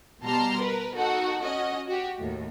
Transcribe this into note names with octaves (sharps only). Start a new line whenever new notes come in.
B2 G3 A5 A#5 C6 F6
A#4 B4
D#4 F#4 A4 F#5
C#4 F#4 D#5
F#4 G4
D#2 A2